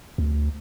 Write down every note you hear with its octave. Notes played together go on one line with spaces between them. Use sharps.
D2